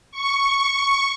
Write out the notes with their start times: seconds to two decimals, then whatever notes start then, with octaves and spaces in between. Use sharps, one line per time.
0.12 C#6